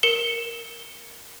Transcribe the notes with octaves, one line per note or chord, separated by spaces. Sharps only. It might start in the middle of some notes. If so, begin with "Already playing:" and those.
A#4 C#7 E7 G7